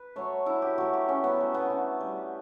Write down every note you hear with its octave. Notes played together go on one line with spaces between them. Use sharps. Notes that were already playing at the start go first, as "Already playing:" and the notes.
Already playing: B4
F#3 A3 C#5
D3 E4
G4
F#3 A3 F#4
G4
D3 C#4
B3
F#3 A3
B3
D3
G3